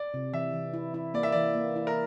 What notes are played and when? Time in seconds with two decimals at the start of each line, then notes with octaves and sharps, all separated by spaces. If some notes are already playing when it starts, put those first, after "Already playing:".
Already playing: D5
0.14 C3
0.33 E3 E5
0.53 E3
0.74 E4
0.94 E4
1.14 A#3 D5
1.23 E5
1.32 E3 D5
1.55 A#3
1.76 E4
1.87 A#4